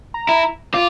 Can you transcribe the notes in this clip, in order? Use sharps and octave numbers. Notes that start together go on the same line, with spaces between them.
A#5
E4
F4 D6